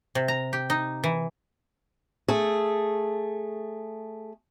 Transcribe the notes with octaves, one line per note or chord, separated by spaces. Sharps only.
C3
A#5
G4
D#4
E3
A3 G#4